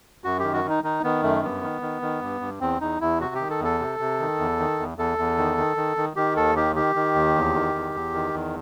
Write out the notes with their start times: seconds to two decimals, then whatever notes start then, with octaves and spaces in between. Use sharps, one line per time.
0.24 F#2 F#4
0.39 D#3 G4
0.53 F#4
0.65 D#3 D#4
0.83 D#3 D#4
1.04 D#3 B3
1.23 F#2 A3
1.42 G2 B3
1.62 D#3
1.82 D#3
2.02 D#3
2.22 G2
2.41 G2
2.61 E2 C4
2.81 E2 D#4
3.01 E2 E4
3.20 C3 F#4
3.35 D#3 G4
3.50 A4
3.61 E2 A4
3.79 C3
4.00 C3
4.20 D#3
4.39 E2
4.59 D#3
4.79 E2
4.98 E2 A4
5.18 E2
5.38 D#3
5.58 D#3
5.77 D#3
5.97 D#3
6.16 D#3 G4
6.36 D#2 A4
6.56 D#3 G4
6.76 D#3 G4
6.95 D#3
7.15 D#2
7.35 E2
7.55 D#3
7.75 E2
7.94 E2
8.14 D#3
8.34 E2